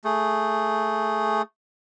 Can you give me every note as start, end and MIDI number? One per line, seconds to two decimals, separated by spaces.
0.05 1.42 57
0.05 1.42 68